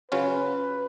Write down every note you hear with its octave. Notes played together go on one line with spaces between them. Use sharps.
C#3 F#3 C#4 F4 B4